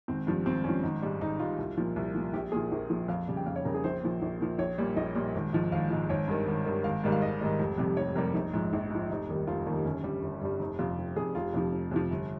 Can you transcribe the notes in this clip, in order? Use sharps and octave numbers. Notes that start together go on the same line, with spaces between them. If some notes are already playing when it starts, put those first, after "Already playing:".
G#1 C4
G2 F3
G#1 C4
G2 F3 C#4
G#1 D#4
G#2 G3
G#1 D#4
G#2 G3 F4
C2
A#2 F3
C2
A#2 F3
A#1 G4
A#2 F3 G#4
A#1 A#4
A#2 F3
F2 F5
C#3 G3
G5
F2 F5
C#5
C#3 G3 A#4
G#4
A#1 C5
A#2 F3
A#1
A#2 F3
A#1 C#5
A#2 G3
A#1 D#5
A#2 G3
G#1
G#2 F3
G#1 F5
G#2 F3
G#1 C#5
G2 D#3
G#1
G2 D#3
G#1 F5
G#2 D#3 G3
F5
G#1 D#5
G#2 D#3 G3
F1
F2 C3 G3
F1 C#5
F2 C3 G3 A#4
A#1 D#4
G#2 F3
A#1
G#2 F3
F1 D#4
D#2 D#3 G3
F1 F4
D#2 D#3 G3 D#4
G1 C#4
G2 G3
G1
G2 G3
F1 D#4
F2 C3 F4
F1 G4
F2 C3 G#4
F1 F4
F2 C3 F3
F1
F2 C3 F3
G1